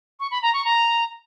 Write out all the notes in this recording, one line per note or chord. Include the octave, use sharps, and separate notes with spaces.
C#6
B5
A#5
C#6
A#5